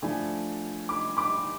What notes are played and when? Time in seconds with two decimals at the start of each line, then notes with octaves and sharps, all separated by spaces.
0.02 F3 A3 D4 G#5 B5
0.89 B5 D6
1.17 B5 D6